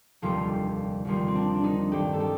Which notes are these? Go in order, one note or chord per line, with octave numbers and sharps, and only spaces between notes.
F1 D#2 D3 F3 G3 F4
D#2 D#3 F3 G3 F4
C4
D4
D4
D#3 D#4
A1 G2 D#3 G3 G4
A4
G3 G4